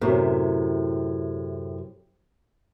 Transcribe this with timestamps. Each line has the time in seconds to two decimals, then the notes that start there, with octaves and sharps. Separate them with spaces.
0.01 F#2 A2 C3